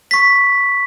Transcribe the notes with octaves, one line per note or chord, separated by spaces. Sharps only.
C#6 B6